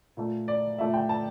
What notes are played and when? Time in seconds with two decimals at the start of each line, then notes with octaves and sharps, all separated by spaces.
0.17 A#2 A3
0.48 D5
0.78 A#2 A3 E5
0.94 G5
1.09 A5